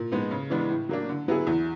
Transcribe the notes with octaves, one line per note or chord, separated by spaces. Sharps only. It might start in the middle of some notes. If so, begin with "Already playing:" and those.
Already playing: A#2
F3 G#3 B3 D#4
C#3
E3 G#3 B3 D4
A2
F#3 A#3 D4
D3
F#3 B3 E4 G#4
E2